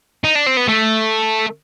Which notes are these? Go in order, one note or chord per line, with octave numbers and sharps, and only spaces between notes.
D#4
D4
C4
B3
A3